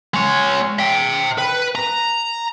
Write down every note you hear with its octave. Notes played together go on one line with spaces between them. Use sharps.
G#3 C#5
E5 G5
B4
A#5